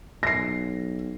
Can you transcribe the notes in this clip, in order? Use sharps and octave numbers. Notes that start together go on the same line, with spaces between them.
B1 A#6 C7